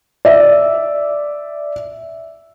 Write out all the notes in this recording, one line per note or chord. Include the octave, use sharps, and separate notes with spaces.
D5 E5